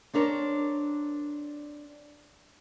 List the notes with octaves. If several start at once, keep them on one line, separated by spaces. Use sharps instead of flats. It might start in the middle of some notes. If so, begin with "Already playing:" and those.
C4 D4 A#4 C#5 D5